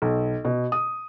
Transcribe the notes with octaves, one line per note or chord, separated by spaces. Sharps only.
B1
B2
D#6